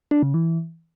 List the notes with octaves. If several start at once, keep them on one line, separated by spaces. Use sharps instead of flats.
D4
C#3
E3